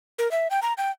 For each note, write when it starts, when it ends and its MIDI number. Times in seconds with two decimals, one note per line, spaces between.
0.19 0.30 70
0.31 0.48 76
0.51 0.60 79
0.62 0.73 82
0.78 0.91 79